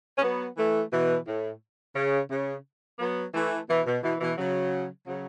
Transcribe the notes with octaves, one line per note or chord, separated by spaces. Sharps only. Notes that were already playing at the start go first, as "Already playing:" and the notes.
C#4
F#3 B3
E3 A3
B2 E3
A2
C#3
C#3
F#3 B3
E3 A3
B2 E3
B2
B2 E3
B2 E3
C#3 F#3
C#3 F#3